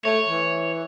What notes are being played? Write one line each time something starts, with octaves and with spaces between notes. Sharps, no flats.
A3 C#5
E3